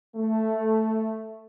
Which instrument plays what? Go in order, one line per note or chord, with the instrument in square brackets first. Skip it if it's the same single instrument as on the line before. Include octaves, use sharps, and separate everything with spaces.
[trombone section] A3